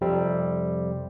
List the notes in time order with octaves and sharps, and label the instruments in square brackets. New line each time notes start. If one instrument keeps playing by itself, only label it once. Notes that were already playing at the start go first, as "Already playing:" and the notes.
[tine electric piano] F2 C3 G3 C4